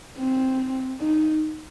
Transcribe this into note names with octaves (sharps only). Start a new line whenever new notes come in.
C4
D#4